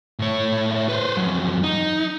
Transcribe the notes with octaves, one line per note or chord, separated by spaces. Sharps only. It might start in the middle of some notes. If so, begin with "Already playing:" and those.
A2 C#5
B4 C5
F2 F#3
D#4